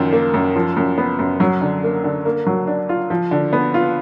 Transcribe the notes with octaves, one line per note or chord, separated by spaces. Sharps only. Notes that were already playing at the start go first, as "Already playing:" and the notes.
Already playing: F#2 D#3 F3
A#3
F#2
F3
F#2
B3
F#2
F#3
D3
A#3
D3
A#3
F#3
D4
F4
F3
D3
B3
F4